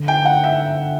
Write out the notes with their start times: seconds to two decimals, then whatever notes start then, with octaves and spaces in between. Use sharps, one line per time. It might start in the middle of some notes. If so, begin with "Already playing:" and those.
Already playing: D3
0.08 G5
0.25 F#5
0.44 E5